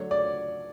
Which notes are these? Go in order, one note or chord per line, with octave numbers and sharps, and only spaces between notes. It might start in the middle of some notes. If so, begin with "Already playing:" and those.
Already playing: D3 F#3 A3 D4 C#5
D5